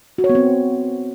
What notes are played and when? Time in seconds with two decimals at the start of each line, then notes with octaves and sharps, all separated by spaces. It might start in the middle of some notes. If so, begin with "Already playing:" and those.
0.18 F#4
0.24 C#5
0.29 B3
0.35 C4